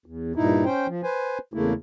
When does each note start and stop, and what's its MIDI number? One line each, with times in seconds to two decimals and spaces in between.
0.06 0.33 40
0.36 0.64 43
0.36 0.64 46
0.36 0.64 63
0.36 0.64 64
0.65 0.87 61
0.65 0.87 72
0.65 0.87 79
0.87 1.01 53
1.03 1.38 71
1.03 1.38 72
1.03 1.38 80
1.54 1.73 40
1.54 1.73 49
1.54 1.73 57
1.54 1.73 58
1.54 1.73 64